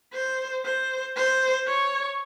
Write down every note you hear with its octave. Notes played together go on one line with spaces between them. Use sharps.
C5
C5
C5
C#5